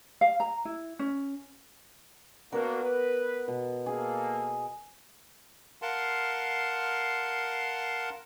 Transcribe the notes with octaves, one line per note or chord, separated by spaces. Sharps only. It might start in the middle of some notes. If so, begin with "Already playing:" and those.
F5
A#5
E4
C#4
A#3 B3 D4 F#4 A#4
B4
B2
A#3 G#4 A4
A#4 F5 F#5 A5 C6